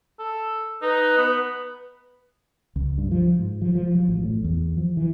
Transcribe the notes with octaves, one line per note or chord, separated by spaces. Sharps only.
A4
D#4 B4
B3
C#2
G2
F3
G#2
F3
F3
F3
A1
A2
E2
F3
E3